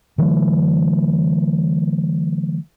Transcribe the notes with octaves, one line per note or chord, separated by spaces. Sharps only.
D3 E3 F#3 A3